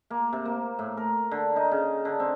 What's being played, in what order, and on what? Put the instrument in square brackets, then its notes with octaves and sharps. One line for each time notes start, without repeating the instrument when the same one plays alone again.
[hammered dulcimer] A#3
C3
A#3
A2
A#4
D3
D#4
C#3
D3
C4